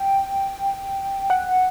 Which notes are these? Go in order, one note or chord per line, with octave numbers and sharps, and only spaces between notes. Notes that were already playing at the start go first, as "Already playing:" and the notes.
Already playing: G5
F#5